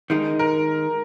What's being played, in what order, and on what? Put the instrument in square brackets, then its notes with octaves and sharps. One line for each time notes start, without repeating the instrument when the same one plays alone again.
[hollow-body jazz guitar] D#3 G#3 D#4
[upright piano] A#4